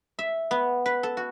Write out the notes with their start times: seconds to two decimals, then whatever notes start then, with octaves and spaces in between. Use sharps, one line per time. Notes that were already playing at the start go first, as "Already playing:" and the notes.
0.19 E5
0.51 B3
0.86 B4
1.03 A4
1.17 F#4